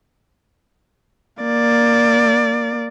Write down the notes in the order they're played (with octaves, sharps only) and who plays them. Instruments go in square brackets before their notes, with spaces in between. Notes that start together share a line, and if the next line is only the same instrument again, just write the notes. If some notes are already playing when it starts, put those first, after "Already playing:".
[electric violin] A#3 D5